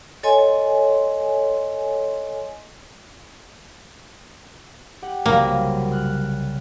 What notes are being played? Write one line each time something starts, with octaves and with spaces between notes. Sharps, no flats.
A4 C#5 D#5 G#5 C6
G4 F#5
C2 F#2 C#3 A#3
F6 F#6